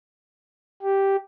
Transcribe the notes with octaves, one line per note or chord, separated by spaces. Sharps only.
G4